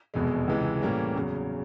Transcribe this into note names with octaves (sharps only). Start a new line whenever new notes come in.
F1 E2 B2 G#3
C#2 C3 E3 G#3
A2 E3 G3 A#3 C#4
E2 C#3 F#3